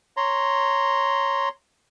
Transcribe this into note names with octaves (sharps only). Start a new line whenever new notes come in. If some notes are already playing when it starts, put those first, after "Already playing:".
C#5 A#5 C6